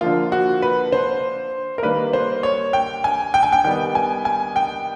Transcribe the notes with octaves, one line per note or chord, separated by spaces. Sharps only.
D3 F3 A#3 F4
F#4
B4
C5
A#4
D#3 G3 A#3 B4
C5
C#5
G5
G#5
G5
G#5
G5
D#3 G3 B3 G5
G#5
G#5
G5